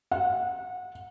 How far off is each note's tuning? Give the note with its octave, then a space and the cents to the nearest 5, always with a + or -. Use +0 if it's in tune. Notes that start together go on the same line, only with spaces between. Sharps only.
F#5 -25